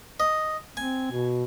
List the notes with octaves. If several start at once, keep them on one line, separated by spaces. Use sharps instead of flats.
D#5
C4 G#5
B2